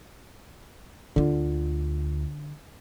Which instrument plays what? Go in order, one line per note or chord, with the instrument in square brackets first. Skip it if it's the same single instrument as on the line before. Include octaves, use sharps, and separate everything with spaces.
[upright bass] D2 F4 [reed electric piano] D3